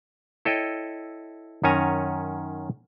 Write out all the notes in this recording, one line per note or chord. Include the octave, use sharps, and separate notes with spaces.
E4 A4 C#5 D#5 G5
F#2 D#3 C#4 C#5 G#5 A#5